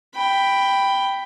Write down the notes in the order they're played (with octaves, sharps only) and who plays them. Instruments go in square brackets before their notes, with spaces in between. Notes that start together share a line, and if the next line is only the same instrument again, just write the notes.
[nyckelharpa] G5 B5